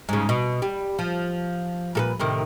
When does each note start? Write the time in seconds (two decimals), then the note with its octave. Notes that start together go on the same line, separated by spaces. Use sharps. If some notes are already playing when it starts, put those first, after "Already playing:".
0.09 G#2 C#3
0.29 B2
0.62 G3
0.99 F3
1.95 A#2 A4 B4
2.20 A2 C3 D#3